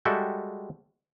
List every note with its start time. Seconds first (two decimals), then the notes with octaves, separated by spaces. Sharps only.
0.05 G3 G#3 F#4 A4 E5 G5